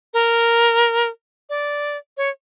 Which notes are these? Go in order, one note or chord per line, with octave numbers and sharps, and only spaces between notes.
A#4
D5
C#5